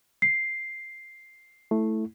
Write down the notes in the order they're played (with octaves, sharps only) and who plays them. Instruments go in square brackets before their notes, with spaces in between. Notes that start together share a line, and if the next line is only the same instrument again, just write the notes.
[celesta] C7
[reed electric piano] A3 E4